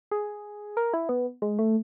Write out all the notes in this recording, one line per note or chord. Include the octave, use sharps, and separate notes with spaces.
G#4
A#4
E4
B3
G#3
A3